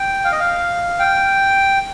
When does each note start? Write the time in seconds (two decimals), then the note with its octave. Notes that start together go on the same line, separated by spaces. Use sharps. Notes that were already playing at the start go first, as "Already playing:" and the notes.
Already playing: G5
0.24 F5
0.32 D#5
0.40 F5
0.99 G5